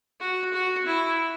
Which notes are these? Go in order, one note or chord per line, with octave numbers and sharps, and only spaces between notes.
F#4
F#4
E4